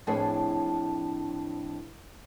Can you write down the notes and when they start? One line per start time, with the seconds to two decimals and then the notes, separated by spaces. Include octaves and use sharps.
0.07 F2 A2 D4 G#4 B4 C#5